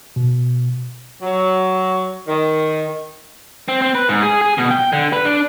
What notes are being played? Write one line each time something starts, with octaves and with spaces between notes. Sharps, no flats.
B2
F#3
D#3
C4
C4
B4
G#2
G#4
G#4
B2
G5
D3
B4
D4